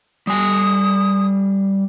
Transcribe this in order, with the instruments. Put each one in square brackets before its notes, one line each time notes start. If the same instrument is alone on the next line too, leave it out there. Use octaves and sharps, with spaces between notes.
[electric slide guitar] G3 G#5 [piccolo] D#6